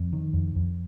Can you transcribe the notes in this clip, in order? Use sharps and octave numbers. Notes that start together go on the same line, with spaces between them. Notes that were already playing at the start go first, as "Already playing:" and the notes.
Already playing: F2
D#3
F2
F2